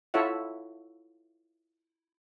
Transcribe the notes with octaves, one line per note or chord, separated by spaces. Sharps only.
E4 F4 A4 C#5 E5 F#5